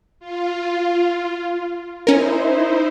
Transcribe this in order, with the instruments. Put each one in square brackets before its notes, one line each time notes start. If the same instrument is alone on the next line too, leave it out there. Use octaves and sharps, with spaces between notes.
[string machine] F4
[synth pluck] C#4 A#4 [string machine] D#4 E4 C5